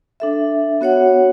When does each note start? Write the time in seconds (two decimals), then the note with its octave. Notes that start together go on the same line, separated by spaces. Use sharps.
0.20 D4 A4 E5
0.81 B3 F#4 C#5 F#5